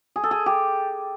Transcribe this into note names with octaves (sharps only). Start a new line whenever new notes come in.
G#4
A4
G#4
G4